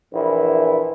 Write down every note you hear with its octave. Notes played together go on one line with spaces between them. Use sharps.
A#1 E3 E4